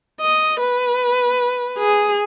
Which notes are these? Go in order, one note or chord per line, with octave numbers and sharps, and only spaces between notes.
D#5
B4
G#4